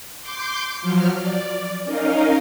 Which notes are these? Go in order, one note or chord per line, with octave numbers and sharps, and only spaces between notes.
C6 D6 G6
F3 F#3 F6
D5
C#4 D#4 A#4 D#5 F5